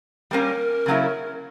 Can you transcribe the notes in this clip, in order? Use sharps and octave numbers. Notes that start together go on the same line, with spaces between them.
G3 A#3 C#4 A#4
C#3 F#3 A#3 C#4 E4